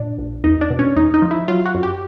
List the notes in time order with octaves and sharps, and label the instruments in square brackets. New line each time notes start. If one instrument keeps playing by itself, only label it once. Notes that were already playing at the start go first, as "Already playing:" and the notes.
Already playing: [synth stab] A#2 D4
A#1
E2 D#4
D4
B2
C#4
E2 D#4
D#4
F3
E4
F#3 F4
F#4
F#2
G4